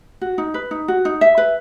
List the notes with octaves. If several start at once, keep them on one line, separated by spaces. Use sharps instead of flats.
F#4
D#4
B4
D#4
F#4
D#4
E5
B4